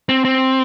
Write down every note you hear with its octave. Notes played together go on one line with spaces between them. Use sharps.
C4
C4